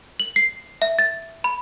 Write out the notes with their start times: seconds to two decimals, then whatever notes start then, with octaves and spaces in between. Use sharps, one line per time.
0.20 F#7
0.36 C7
0.82 E5
0.99 A6
1.44 B5